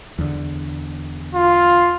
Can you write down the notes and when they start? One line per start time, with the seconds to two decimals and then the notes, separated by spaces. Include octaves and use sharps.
0.18 E2 D3
1.35 F4